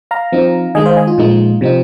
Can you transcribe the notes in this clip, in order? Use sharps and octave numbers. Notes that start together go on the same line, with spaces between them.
F5 A#5
F3 C4 D#4
D#3 G#3 D#4 D#5 G#5
C5 F5
D#5 G#5
F4
A#2 F3 G#3 D#4
C3 F3 C4 D#4